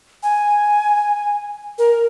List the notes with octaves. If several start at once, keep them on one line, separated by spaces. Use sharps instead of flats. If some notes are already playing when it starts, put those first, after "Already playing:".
G#5
A#4